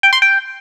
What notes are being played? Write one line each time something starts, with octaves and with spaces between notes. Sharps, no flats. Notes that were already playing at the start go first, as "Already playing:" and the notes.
G5
C6
G5